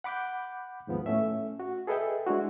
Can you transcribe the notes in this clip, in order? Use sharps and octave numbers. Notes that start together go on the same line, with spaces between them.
F#5 B5 D6 F#6 G6
D#2 G#2 F3 B3
A2 A3 C#4 E5
F#4
G#4 A4 B4 D#5 E5 G5
G#3 D4 E4 F#4